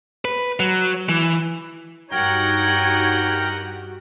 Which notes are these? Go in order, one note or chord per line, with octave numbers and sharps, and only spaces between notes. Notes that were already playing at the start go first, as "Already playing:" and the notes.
B4
F#3
E3
G2 D#4 F#4 G4 A#4 C#5 F#5 G5